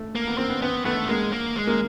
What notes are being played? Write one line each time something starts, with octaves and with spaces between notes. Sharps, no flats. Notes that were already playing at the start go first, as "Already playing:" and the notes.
Already playing: A3
A#3
B3
A#3 C4
B3
B3 C4
A3 B3
G#3 A#3
A#3
G#3
A#3